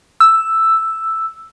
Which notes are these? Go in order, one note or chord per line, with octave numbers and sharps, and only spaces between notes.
E6